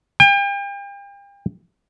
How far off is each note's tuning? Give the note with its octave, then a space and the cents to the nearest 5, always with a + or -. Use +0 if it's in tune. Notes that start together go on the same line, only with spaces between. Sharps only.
G5 +40